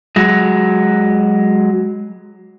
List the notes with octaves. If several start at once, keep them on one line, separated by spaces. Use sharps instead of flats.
F#3 G#3